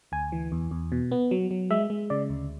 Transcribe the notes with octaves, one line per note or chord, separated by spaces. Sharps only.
D2 G#5
E3
E2
E2
B2
B3
F#3
F#3
G#3 E5
G#3
C#3 D5
D2